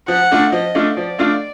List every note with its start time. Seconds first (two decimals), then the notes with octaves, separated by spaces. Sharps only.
0.08 F3 F#5
0.31 A3 D4 F4
0.52 F3 D#5
0.75 A3 D4 F4
0.97 F3 D5
1.19 A3 D4 F4